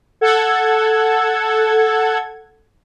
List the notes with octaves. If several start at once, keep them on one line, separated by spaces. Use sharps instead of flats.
A4 F#5 G#6